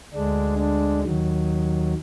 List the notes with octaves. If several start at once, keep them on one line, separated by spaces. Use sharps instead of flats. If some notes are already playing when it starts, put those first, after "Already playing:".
D2 D3 G#3 D4
D4
D#2 D#3 F#3